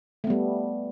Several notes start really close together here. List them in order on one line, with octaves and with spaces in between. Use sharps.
A3 B3 G3